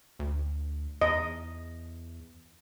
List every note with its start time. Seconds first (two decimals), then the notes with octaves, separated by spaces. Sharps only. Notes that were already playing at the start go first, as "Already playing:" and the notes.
0.19 D2
1.01 E2 D#5